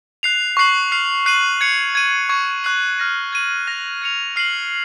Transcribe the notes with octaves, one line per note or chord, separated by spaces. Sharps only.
F#6 C7 F7
C#6 F#6 C7 F#7
F6 C7 F7
F#6 C7 D#7 F#7
G#6 C#7 F7
G#6 D#7 F#7
C#6 G#6 C#7
C#6 F#6 C7 F#7
F6 A#6 D#7
G#6 D#7 F#7
F#6 A#6 F7
G#6 C#7 F7
F6 C7 D#7 F#7